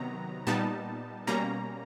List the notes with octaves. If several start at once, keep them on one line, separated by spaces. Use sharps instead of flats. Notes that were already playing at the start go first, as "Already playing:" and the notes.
Already playing: C3 D#3 F#3 B3 A#5
A#2 G3 B3 D#4 A5
B2 G3 A#3 C#4 A#5